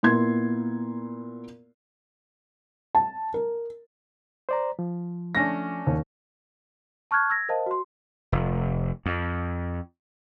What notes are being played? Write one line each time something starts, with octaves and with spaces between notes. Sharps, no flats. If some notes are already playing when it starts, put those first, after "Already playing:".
A#2 B3 E4 C6 G#6
A5
A#4
C5 D5 A#5
F3
A3 C#4 D4 A#6
D#2
A5 C#6 F6 F#6 G#6
E6 G#6 A#6
A#4 C5 D#5 F5 A5
F#4 C6
F1
F2